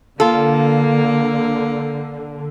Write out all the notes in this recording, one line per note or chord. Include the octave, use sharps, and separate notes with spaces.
D3 A#3 F4 A4